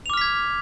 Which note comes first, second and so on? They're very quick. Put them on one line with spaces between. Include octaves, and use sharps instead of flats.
F7 D6 F6 B6 G#6